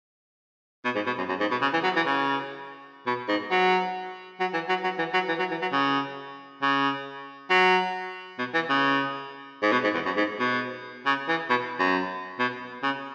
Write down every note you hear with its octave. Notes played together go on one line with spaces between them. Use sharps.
B2
G#2
B2
F#2
F#2
G#2
B2
C#3
E3
F#3
E3
C#3
B2
G#2
F#3
F#3
E3
F#3
F#3
E3
F#3
E3
F#3
E3
F#3
C#3
C#3
F#3
B2
E3
C#3
G#2
B2
G#2
E2
F#2
G#2
B2
C#3
E3
B2
F#2
B2
C#3